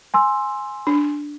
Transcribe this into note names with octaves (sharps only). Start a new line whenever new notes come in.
G#5 C6 E6
D4